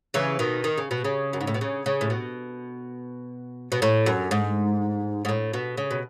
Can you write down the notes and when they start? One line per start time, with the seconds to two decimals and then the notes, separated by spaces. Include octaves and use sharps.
0.14 C#3 E3
0.39 B2 D#3
0.64 D#3
0.78 C#3
0.91 B2
1.04 C#3
1.33 F#2
1.41 G#2
1.47 A2
1.54 B2
1.61 C#3
1.86 C#3
2.01 A2
2.10 B2
3.72 B2
3.82 A2
4.06 F#2
4.31 G#2
5.25 G#2
5.29 A2
5.53 B2
5.77 C#3
5.91 B2